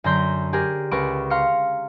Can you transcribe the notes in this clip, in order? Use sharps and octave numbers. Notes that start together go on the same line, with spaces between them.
F#2 D3 A#5 C6 G6 B6
G4 G#4 A#4
C#2 A#4 B4 C#6 D7
F5 A#5 C6 F6 C#7